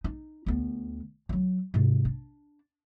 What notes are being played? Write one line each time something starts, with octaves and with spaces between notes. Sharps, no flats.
D#4
D2 B3
F3 F#3
G#2 C3
D4